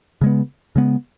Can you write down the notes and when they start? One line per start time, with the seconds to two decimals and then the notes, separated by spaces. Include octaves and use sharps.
0.21 C#3 G#3 B3
0.76 C#3 G#3 B3